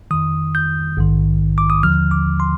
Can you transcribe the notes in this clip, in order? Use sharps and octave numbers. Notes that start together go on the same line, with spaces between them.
F2 D#3 D#6
G6
A#1 G#2 D#3
D6
D#6
D#2 D3 F3 F6
D6
C6